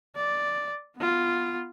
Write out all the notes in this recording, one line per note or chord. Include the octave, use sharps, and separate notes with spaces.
D5
B3 F4